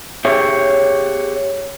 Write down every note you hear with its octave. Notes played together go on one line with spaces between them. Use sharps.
G4 G#4 C#5 E5